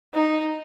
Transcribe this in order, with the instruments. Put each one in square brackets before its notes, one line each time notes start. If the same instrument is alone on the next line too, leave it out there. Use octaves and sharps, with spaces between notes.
[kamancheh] D#4